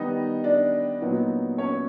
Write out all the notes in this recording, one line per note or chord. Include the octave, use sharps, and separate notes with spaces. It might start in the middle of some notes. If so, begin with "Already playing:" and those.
Already playing: D#3 G3 B3 D#4 D#5
D4 D5
A#2 F#3 B3 D#4
C#4 C#5